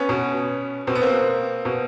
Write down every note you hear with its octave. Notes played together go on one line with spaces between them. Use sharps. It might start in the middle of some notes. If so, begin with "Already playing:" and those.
Already playing: B3 C#4
B2
B2 C4
B3
A#3 C4
B2